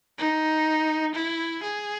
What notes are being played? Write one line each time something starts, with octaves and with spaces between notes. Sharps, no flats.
D#4
E4
G#4